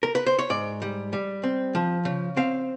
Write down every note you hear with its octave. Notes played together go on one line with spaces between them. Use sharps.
A#4
B4
C5
C#5
G#2 D5
G3
G3
C4
F3
C#3
C4 F5